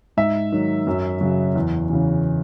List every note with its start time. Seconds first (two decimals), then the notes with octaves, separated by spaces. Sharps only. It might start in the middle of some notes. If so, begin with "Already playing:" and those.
0.17 G#2 E5
0.52 D#3 F#3
0.87 F#2
1.21 C#3 F#3
1.55 E2
1.90 C#3 E3